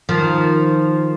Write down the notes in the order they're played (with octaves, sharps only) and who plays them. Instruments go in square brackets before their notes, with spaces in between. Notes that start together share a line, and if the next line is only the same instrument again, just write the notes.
[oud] D#3 F3